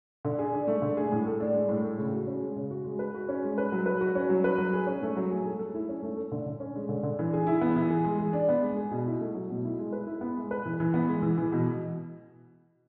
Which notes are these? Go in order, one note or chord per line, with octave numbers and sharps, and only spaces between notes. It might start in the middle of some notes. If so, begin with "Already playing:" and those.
D3
G#4
D4
A3
D3
G#4
A2
A4
D4
G#3
A2
A4
C#3
F#4
C#4
G#3
C#3
F#4
G#3
B4
F#4
C#4
G#3
B4
F#3
B4
F#4
C#4
F#3
B4
F#3
G#4
C#4
A3
F#3
G#4
A3
A4
E4
C#4
A3
A4
D3
D3
C#4
G#3
D3
D3
E3
G#4
E4
B3
E3
G#4
G#3
G#4
D4
B3
G#3
G#4
B2
E4
A3
F#3
B2
E4
G#3
B4
E4
B3
G#3
B4
E3
E3
B3
G#3
E3
E3
B2